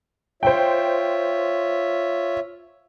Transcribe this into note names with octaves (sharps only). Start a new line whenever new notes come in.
F4 C5 C#5 E5 G5